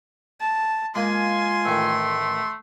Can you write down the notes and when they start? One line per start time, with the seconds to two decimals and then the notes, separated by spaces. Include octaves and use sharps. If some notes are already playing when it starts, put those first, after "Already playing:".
0.41 A5
0.95 G#3 A#3 F4 G#5 C6
1.65 A1 D#3 A3